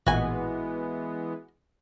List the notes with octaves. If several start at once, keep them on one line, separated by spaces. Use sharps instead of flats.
A1 A#2 E3 G#3 B3 F#4 G#5